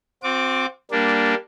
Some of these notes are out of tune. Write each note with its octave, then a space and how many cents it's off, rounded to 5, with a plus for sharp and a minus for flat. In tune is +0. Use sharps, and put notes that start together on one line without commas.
C4 +0 F#4 -45 D6 +0
G3 +0 A#3 +0 D4 -5